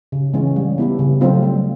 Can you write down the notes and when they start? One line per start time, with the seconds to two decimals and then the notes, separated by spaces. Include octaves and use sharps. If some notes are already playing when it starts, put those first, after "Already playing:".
0.12 C#3
0.34 E3 G#3 C#4
0.56 G3
0.78 B3 E4 G4
0.99 C#3
1.21 F#3 A3 C4 F4
1.42 G3